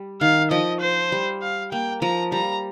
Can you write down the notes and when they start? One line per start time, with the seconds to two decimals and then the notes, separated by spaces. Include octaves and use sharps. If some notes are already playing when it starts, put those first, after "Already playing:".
Already playing: G3
0.21 D#3 F5
0.51 F3 D#5
0.81 C5
1.12 G3
1.42 F5
1.72 A#3 G5
2.02 F3 A#5
2.32 G3 A#5